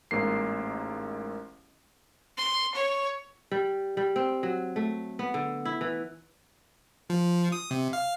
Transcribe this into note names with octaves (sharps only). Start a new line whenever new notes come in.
A1 G#2 A#3 C7
C6
C#5
G3
G3
C4
F#3
A3
B3
D3
E4
E3
F3
D#6
C3
F5